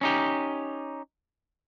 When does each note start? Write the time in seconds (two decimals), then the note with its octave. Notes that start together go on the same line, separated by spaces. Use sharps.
0.01 C#4 D#4 G4